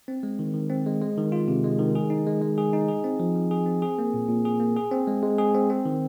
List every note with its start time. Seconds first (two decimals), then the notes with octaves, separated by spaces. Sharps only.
0.08 C4
0.23 G#3
0.39 D#3
0.54 D#3
0.70 C4
0.86 G#3
1.02 G#3
1.17 D#3
1.32 F4
1.48 C3
1.64 G#3
1.79 D#3
1.95 G#4
2.10 D#4
2.27 G#3
2.42 G#3
2.58 G#4
2.73 D#4
2.88 G#4
3.04 C4
3.20 F3
3.35 F3
3.51 G#4
3.66 C4
3.82 G#4
3.99 A#3
4.14 A#2
4.29 A#2
4.45 G#4
4.60 A#3
4.77 G#4
4.91 C4
5.07 G#3
5.23 G#3
5.38 G#4
5.54 C4
5.70 C4
5.85 D#3